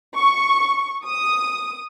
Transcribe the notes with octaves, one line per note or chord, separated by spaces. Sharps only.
C#6
D#6